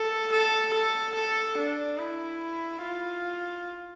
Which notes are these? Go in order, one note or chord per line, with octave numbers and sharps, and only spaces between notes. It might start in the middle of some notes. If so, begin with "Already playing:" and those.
Already playing: A4
A4
A4
A4
D4
E4
F4